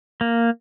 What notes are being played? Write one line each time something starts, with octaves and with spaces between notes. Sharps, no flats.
A#3